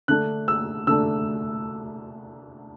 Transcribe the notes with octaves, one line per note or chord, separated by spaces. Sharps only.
D3 A3 D4 F#6
E6
D3 A3 D4 E6